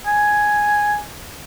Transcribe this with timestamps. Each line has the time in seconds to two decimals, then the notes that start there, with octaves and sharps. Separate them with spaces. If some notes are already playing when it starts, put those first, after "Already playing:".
0.06 G#5